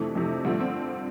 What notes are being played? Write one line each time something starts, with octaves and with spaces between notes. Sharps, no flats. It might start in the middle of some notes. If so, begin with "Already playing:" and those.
Already playing: F2 C3 E3 A3 D4
F2 C3 E3 A3
G2 D3 F3 A3 C4
C4